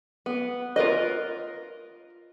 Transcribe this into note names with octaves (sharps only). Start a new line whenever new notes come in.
B3
F4 A#4 B4 D#5